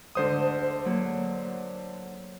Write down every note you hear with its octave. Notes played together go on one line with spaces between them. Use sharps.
D2 G#2 D3 A4 C5 D#6
F#3 A#3 C#5